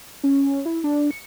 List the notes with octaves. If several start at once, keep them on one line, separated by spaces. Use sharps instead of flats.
C#4
E4
D4
C#7